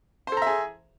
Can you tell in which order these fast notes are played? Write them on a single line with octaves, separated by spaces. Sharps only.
C5 A4 A#5 E5 G#4